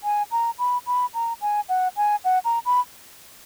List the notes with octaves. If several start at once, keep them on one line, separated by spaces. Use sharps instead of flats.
G#5
A#5
B5
B5
A#5
G#5
F#5
G#5
F#5
A#5
B5